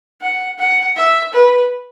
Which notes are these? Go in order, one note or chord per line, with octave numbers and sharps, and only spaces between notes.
F#5
F#5
E5
B4